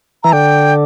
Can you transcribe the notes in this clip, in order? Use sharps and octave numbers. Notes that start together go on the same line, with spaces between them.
E3 A#5
D3 G5